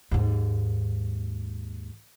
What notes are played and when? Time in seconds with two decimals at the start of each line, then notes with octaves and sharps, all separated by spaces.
0.11 D#2 G#2